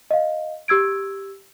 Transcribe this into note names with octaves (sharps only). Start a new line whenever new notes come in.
D#5 F5
G4 E6 G#6 D7